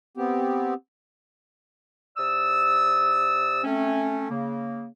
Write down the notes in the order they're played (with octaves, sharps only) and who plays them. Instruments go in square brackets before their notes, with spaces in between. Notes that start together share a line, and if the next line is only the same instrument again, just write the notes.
[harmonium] B3 C4 G4
[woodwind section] C3 D5 D#6 E6
A3 C4 C#4
C#3 A#3